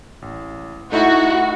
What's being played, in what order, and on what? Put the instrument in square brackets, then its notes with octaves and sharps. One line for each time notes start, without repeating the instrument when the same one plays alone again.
[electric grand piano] A1
[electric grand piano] A3 D#4 E4 [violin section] F#4